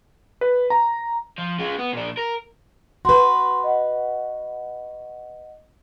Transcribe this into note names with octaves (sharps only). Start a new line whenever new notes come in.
B4
A#5
F3
G#3 F4
B3
A#2 D4
A#4
F#4 B4 C6
D#5 F#5